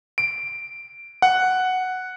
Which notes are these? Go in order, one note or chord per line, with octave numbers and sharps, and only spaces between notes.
D7
F#5